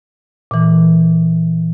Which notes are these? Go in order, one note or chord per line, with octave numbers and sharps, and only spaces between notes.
A#2 E3